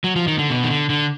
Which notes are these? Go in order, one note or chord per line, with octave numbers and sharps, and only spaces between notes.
F#3
F3
D#3
D3
B2
D#3
D3
D3